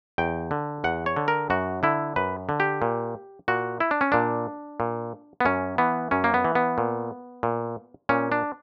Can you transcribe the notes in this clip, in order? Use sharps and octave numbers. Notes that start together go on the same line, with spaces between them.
E2 G5
D3
E2 F#5
C#5
D3
A#4
F#2 F#4
D3 E4
F#2 B4
D3
G4
A#2
A#2 F#4
E4
D4
C#4
A#2 D4
A#2
B3
F#2 C#4
E3 B3
F#2 C#4
A#3
B3
E3
B3
A#2
A#2
A#2 C#4
D4